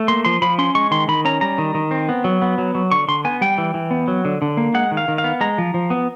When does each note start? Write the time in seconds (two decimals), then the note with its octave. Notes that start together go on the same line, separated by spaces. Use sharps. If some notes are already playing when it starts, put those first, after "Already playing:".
Already playing: A3
0.08 A#3 C6
0.25 F3 C6
0.42 F3 B5
0.58 C#4 C6
0.75 G#3 C#6
0.91 D#3 C6
1.08 D#3 B5
1.25 C#4 A#5
1.41 G3 A#5
1.58 D#3
1.75 D#3
1.91 C4
2.09 B3
2.24 F#3
2.42 B3
2.58 F#3
2.75 F#3
2.92 D3 C#6
3.08 D3 C6
3.25 B3 G#5
3.41 G3 G5
3.58 E3
3.74 E3
3.91 B3
4.08 F#3
4.25 D3
4.42 D3
4.57 A#3
4.74 G#3 F#5
4.92 D#3
4.97 F5
5.08 D#3
5.18 F5
5.24 B3
5.41 G#3 A#5
5.58 F3
5.74 F3
5.90 B3